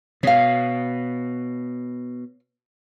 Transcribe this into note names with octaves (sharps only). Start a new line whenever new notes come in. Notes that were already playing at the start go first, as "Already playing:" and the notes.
B2 C#5 F5